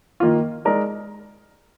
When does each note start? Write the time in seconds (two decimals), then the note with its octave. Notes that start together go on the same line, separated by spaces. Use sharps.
0.20 D#3 A#3 F4
0.65 G#3 D#4 A#4 D5